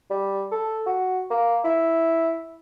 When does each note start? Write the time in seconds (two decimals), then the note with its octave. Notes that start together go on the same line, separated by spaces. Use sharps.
0.10 G3
0.52 A4
0.86 F#4
1.31 A#3
1.65 E4